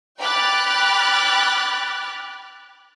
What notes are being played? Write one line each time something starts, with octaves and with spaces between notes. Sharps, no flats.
G5 B5 D6 F6 F#6 A6